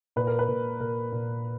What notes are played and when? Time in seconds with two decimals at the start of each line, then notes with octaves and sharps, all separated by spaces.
0.16 A#2 B4
0.27 A#4
0.39 B4
0.48 A#2
0.80 A#2 A#4
1.12 A#2